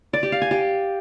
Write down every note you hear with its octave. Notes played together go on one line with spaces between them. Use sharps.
D5
G4
F5
G#5
G4